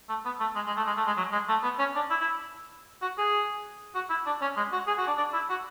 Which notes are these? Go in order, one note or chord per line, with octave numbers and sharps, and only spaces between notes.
A3
B3
A3
G#3
G#3
A3
G#3
A3
G#3
F#3
G#3
A3
B3
C#4
D4
E4
E4
F#4
G#4
F#4
E4
D4
C#4
G#3
F#4
G#4
F#4
D4
D4
E4
F#4